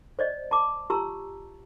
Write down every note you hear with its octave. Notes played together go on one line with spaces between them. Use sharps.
C5 D5 D#5
A5 D6
F4 G4 A5 A#5 C#6 E6